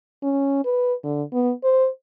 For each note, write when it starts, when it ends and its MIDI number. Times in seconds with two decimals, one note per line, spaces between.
0.22 0.63 61
0.65 0.93 71
1.04 1.23 50
1.33 1.52 59
1.64 1.88 72